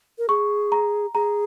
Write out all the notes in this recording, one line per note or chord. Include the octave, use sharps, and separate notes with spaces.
A#4
G#4 C#6
A#5
G#4 A#5